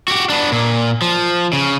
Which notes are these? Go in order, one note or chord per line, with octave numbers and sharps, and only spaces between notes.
F#4 G4
B3 D4
A#2
F3
C#3